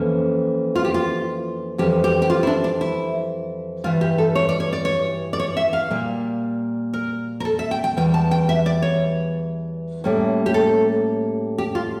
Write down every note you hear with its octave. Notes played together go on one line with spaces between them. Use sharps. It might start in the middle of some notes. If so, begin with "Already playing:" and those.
Already playing: F2 E3 A#3 C#4
F4
G4
F4
F2 E3 G3 G4
G4
G4
F4
E4
D4
D4
E4
G2 E3 G3 F4
G4
A4
C#5
D5
C#5
D5
C#5
D5
C#5
E5
F5
A#2 G3 A#3
A#4
A#4
A4
E5
G5
G5
E2 E3 G3 G5
A5
G5
E5
D5
C#5
A2 G3 A#3 C#4
G4
A4
G4
F4